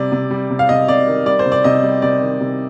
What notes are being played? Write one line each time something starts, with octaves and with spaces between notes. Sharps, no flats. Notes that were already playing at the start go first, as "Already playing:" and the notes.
Already playing: C3 G3 D5
C3
G3
C3
F5
C3 D#5
C3 D5
D#3
G3 D5
C5
C3
D5
C3 D#5
G3
C3 D5
D#3
C3